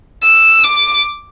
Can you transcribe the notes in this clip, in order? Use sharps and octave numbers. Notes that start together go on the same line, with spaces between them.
E6
D6